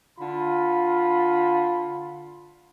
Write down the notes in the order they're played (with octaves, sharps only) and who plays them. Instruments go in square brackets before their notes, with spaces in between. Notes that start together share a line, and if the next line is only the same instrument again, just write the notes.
[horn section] D3 F4 B5